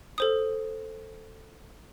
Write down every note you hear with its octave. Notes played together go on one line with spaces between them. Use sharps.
A4 C5 D#6